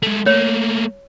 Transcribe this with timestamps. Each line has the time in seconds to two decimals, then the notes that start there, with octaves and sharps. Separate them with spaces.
0.03 G#3 A3
0.26 A3 A#3 C#5